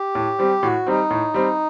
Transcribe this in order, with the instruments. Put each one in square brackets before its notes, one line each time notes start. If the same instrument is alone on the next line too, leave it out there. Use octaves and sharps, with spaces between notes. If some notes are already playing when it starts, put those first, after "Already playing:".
Already playing: [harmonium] G4
[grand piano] A2
G3 C4
[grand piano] A2 [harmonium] F#4
[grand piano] G3 C4 [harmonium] D#4
[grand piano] A2
G3 C4